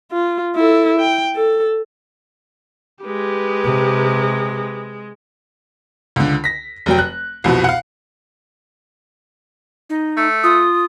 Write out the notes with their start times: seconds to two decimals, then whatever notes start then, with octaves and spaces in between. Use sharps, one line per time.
0.12 F4
0.56 E4 A4
0.99 G5
1.36 A4
3.05 G#3 G4 B4
3.64 C3
6.16 C#2 D3
6.44 A#6 B6
6.86 F1 F#3 G5
6.99 F#6
7.44 C2 F2 B2
7.64 F5 F#5
9.90 D#4
10.17 A3
10.43 F4 D#6